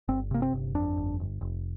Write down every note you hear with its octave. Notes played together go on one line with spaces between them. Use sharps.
G1 C4
C3 A#3
C4
G1
F2 D4
G1
G1
F1